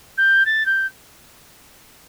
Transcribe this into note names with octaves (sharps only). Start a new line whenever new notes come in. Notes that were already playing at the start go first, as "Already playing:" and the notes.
G6
A6
G6